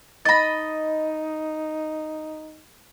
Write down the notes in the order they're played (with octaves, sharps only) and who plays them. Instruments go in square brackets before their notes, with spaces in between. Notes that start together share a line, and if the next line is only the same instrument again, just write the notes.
[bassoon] D#4 [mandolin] D#5 B5 [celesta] A6 A#6